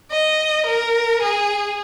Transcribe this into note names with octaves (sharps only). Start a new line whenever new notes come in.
D#5
A#4
G#4